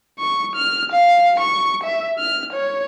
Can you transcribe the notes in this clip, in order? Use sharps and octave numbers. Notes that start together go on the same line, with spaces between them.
C#6
F6
F5
C#6
E5
F6
C#5